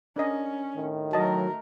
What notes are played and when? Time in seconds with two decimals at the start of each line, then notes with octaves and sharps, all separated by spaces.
0.16 C#4 D4 A#4 D#5
0.75 A2 D#3
1.13 F#3 A3 A#4 D#5 A5